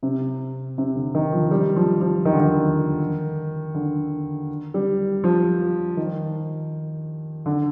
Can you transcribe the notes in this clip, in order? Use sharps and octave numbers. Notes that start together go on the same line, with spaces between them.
C3
C3
D3
D#3
F3
G3
F3
F3
D#3
D3
D#3
D3
G3
F3
D#3
D3